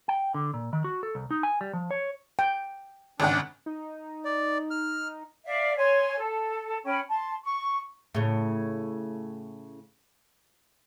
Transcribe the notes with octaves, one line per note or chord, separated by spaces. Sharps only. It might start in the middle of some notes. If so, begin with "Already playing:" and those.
G5
D3
A#2
D#3
F#4
A4
C2
D#4
G#5
G3
F3
C#5
G5
G#1 C#3 D4 F#5
D#4
D5
F6
D5 E5 F5
C#5 G#5 C6
A4
C#4 G5 B5
A5 C6
C#6
A2 C#3